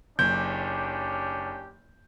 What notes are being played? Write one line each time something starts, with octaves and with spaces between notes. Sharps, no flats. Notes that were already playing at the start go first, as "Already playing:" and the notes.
F#1 C#4 D4 G4 G6